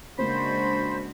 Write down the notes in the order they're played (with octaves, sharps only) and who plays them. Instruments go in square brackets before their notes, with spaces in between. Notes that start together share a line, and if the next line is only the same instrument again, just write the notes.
[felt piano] C#3 A#3 [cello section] G#3 D4 F#4 [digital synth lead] C5 [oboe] B5